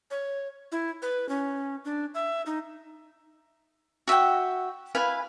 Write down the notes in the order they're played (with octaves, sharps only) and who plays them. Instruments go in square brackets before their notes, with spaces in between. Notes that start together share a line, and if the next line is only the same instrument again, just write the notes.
[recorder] C#5
E4
B4
C#4
D4
E5
D#4
[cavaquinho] F#4 E5 F#5 G5
E4 B4 F5 G#5